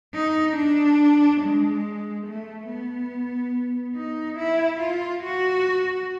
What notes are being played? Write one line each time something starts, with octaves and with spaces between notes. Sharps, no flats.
D#4
D4
G#3
A3
B3
D#4
E4
F4
F#4